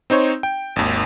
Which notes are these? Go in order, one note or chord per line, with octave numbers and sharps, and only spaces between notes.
C4 D#4 C5 C#5
G5
G#1 D#2